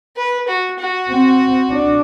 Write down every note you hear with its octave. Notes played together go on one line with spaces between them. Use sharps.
B4
F#4
F#4
C4
D4